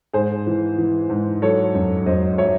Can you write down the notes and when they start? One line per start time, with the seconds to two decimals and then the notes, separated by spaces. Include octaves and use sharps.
0.13 G#2 G#4 C5
0.47 E3
0.78 E3
1.10 G#2
1.42 F#3 A4 C#5
1.75 F#2
2.06 F#2 C5 D#5
2.38 F#3 C#5 E5